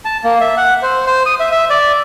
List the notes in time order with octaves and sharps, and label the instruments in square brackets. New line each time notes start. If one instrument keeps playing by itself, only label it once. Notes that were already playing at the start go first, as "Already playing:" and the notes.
[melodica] A5
A#3
E5
F#5
C5
C5
D#6
E5
E5
D5